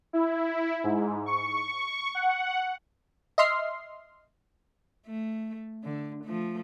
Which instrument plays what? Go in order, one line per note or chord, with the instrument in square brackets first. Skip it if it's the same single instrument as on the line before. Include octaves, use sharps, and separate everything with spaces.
[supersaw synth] E4
G#2
C#6
F#5
[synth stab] D#5 E5 C6 F6 C7
[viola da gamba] A3
D3
F3 A3